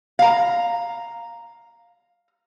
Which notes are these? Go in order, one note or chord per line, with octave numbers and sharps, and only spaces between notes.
F5 A#5